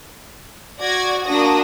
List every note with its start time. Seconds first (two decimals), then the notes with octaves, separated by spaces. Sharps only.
0.80 F#4 D5 G#6 A#6
1.24 A#3 D4 F#4 D#6 A#6